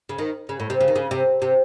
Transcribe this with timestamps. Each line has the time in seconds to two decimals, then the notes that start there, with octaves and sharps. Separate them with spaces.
0.09 C#3
0.18 D#3
0.49 C#3
0.60 A2
0.70 C3
0.80 C#3
0.88 D#3
0.96 C#3
1.11 C3
1.42 C3